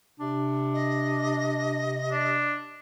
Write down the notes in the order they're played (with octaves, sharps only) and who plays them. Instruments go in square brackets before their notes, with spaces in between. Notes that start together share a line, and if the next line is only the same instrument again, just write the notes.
[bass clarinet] C3 [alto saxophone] D4
[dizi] D#5
[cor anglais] D4